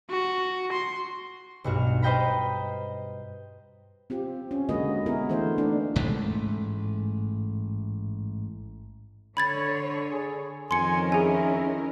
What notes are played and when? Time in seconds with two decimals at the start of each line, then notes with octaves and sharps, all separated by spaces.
0.10 F#4
0.72 C6
1.64 B1 G2 F#4 F6
2.02 B4 C5 D#5 G5 A#5 B5
4.10 C4 F4 G4
4.51 C#4
4.69 D3 G#3 A#3 F#4 B4 D#5
5.06 B3 E4 G#4 A#4
5.29 E3 A3 A#3 D4 C5
5.58 A3 D4 D#4
5.96 A1 G#2 G#3 A3
9.37 D3 C#5 B5 G#6 A6
10.11 G#4
10.71 F2 D#3 C#4 A#4 G#5 C6 C#7
11.12 E4 G#4 G#5